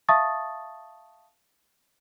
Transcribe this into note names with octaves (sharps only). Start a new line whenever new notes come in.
E5 F5 A5 C#6 D#6 A6